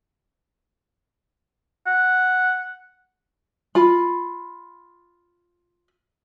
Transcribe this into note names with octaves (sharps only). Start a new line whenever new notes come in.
F#5
F4 B5